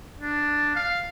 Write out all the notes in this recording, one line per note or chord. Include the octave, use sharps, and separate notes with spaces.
D4
F5